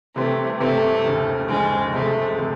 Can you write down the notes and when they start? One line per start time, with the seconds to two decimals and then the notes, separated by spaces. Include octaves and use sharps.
0.15 C3 E3 G3 A3 C4
0.60 C3 E3 G3 A3 C4
1.05 D#2 C#3 F3
1.48 D#2 C#3 F3 G#3
1.93 C3 F3 G#3 A3
2.38 C3 F3 G#3